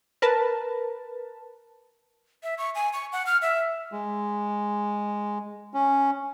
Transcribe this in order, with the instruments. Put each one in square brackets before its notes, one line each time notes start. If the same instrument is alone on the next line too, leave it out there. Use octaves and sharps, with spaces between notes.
[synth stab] A#4 B4 A5
[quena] E5
C#6
G#5
C#6
F#5
F6
E5
[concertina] G#3
C#4